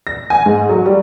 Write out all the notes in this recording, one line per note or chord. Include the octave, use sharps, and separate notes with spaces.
A#6
G#5
G#2
F#3
G3